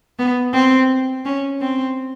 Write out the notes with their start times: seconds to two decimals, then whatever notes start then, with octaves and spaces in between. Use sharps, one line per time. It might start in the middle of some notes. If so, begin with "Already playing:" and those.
0.19 B3
0.53 C4
1.25 C#4
1.61 C4